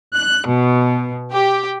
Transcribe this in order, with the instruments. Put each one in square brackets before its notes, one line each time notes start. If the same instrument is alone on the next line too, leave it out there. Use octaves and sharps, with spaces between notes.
[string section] F#6
B2
G4